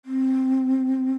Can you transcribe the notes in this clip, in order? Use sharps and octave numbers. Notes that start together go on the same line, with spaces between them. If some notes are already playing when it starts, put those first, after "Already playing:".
C4